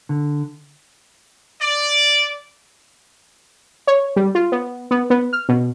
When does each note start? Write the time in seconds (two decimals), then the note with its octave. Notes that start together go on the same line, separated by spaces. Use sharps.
0.09 D3
1.61 D5
3.87 C#5
4.16 G3
4.35 F4
4.52 B3
4.91 B3
5.10 B3
5.33 F6
5.49 B2